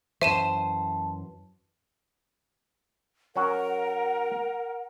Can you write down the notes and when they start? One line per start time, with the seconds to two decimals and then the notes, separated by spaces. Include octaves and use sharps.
0.21 F#2 E3 C5 E5 A5 D#7 E7
3.36 F#3 C#4 F#4 A#4 F#5